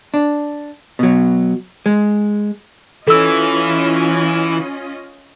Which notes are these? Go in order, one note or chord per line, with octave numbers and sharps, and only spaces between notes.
D4
B2 F#3
G#3
E3 C#4 F4 A4 D#5 E6